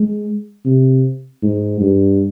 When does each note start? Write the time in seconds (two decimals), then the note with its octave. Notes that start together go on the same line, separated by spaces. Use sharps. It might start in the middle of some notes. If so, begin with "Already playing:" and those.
Already playing: G#3
0.65 C3
1.43 G#2
1.81 G2